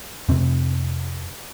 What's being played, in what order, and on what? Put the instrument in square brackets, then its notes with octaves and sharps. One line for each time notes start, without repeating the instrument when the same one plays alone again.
[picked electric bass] F2 C3 C4